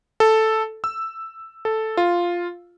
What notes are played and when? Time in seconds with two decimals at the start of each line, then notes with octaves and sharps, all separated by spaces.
0.20 A4
0.84 E6
1.65 A4
1.97 F4